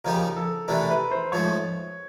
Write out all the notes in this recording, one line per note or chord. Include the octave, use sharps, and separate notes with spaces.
C#3 F3 A#3 D#4 G4 A#4
A4
C3 E3 A3 D4 A#4
B4
C5
G#2 F3 A3 C#5